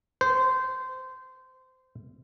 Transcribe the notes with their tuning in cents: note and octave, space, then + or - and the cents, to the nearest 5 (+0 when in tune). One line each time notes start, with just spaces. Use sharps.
C5 -20